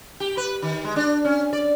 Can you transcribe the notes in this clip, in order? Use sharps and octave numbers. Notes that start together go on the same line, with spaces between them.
G4
B4
D#3
G#3
D4
C#4
D5